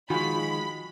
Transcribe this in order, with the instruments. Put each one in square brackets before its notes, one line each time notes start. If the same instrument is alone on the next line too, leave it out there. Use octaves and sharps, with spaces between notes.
[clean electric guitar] D#3 F3 G#3 [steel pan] F4 F#4 G#5 [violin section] B5